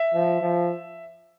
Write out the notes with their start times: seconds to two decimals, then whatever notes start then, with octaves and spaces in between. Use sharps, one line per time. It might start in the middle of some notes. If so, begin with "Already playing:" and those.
Already playing: E5
0.14 F3
0.42 F3